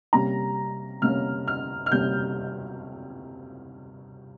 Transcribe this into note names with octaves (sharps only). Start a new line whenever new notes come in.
C3 G3 A#3 C#4 A#5
C3 G3 A#3 C#4 F6
F6
F6
C3 G3 A#3 C#4 G6